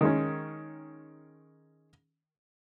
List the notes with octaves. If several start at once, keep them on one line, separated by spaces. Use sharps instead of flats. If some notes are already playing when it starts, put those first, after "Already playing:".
D#3 G#3 C#4